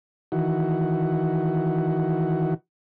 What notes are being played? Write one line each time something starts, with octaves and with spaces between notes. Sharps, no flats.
D#3 E3 F#4